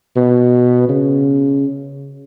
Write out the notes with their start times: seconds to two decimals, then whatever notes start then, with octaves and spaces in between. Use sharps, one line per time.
0.16 B2
0.89 C#3